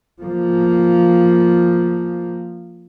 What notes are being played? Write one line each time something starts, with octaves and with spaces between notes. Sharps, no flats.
F3 A#3